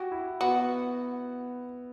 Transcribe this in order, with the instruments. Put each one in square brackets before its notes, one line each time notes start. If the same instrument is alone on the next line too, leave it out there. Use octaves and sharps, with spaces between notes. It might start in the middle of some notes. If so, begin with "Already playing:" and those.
Already playing: [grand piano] F#4 [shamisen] G4
[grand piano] E4
[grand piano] B3 [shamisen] F#4